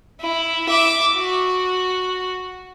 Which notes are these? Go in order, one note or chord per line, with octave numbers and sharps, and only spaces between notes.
E4
E5 D6
F#4